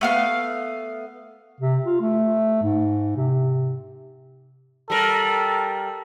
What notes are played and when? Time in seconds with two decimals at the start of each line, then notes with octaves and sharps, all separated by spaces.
0.01 A3 B3 F5
1.60 C3
1.85 F4
2.01 A3
2.63 G#2
3.17 C3
4.90 G3 A4 A#4